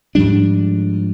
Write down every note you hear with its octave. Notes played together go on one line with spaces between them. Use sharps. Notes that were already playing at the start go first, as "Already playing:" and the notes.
G#2 F3 G3 D4